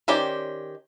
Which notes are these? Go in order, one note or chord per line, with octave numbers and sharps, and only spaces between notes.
D#3 C#4 G4 C5 D5